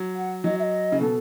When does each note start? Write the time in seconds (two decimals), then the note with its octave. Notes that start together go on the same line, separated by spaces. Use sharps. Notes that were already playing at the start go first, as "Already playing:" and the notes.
Already playing: F#3
0.15 F#5
0.44 F#3 D#5
0.59 E5
0.62 D#5
0.92 C#3
1.01 B2 A4